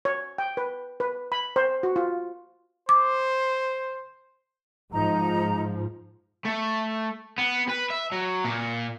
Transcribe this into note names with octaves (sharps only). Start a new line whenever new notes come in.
C#5
G5
B4
B4
B5
C5
F#4
F4
C5 D6
G#2 F3 D#4 A#5
A3
B3
B4
E5
F#3
A#2